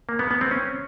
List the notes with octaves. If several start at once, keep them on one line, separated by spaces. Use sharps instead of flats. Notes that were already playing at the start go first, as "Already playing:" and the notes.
A#3
B3
B3
C4
C#4